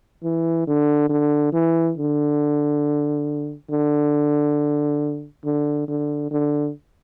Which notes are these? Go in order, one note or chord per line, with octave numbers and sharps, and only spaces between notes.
E3
D3
D3
E3
D3
D3
D3
D3
D3